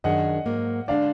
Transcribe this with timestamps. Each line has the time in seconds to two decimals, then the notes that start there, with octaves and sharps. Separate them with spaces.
0.04 F#2 D#3 F#3 D4 G#4 D#5 F#5
0.46 G#2 F#3 A#3
0.88 D3 G#3 D4 D5 F5